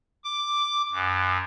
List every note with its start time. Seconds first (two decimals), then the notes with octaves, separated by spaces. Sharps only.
0.24 D6
0.92 F#2